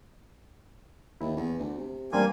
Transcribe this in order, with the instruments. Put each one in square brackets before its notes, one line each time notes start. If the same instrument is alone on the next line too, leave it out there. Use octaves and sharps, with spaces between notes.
[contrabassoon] D#2 [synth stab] E4
[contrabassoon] E2
D2
C3
[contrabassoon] A1 [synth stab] G3 C4 D4 [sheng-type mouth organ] A#3 G#5